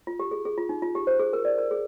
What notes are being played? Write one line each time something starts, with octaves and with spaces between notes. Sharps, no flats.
F4
G4
G#4
G#4
F4
D#4
F4
G4
C5
G#4
A#4
D5
A#4
G#4